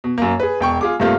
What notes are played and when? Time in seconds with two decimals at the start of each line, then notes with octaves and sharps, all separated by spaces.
0.04 B2
0.18 F#2 A#3
0.40 G#4 B4
0.61 E1 G5 C#6
0.81 F4 G#4 D6
1.00 G2 C3 A3 A#3 F4